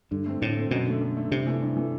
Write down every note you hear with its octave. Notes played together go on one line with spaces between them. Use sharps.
G2 D3
A3 C4
A2 D3
A3 C4
F#2 B2
D3 A3
F#2
D3 A3
G2 C3
E3 A3
G2
E3 A3